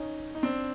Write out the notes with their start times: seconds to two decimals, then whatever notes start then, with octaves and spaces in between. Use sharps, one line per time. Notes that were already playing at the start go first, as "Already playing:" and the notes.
Already playing: C#4 D#4
0.35 D#4
0.43 C4 D4